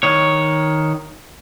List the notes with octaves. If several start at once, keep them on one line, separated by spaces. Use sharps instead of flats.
D#3 C#5